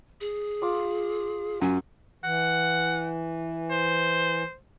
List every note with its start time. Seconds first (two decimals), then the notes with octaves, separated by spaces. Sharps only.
0.21 G#4
0.62 F4 D6
1.62 F#2 G#5
2.24 E3 F#5
3.71 C5